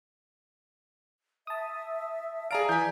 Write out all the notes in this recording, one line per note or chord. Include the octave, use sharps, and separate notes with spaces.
E5 A5 D#6
G#4 D5 F5 A5 A#5 D7
E3 G#5 G6 B6